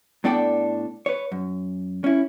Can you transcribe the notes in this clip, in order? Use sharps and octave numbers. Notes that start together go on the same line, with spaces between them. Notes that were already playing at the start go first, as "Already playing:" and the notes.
A2 B3 D4 A4 D5 G5
B4 C#5
F#2
C#4 E4